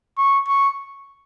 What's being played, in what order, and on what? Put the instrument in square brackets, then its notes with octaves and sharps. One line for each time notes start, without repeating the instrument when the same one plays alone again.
[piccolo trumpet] C#6
C#6